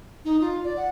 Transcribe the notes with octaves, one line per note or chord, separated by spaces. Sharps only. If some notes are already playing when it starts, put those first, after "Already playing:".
D#4
F4
D5
F#5